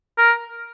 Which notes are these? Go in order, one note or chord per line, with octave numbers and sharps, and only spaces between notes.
A#4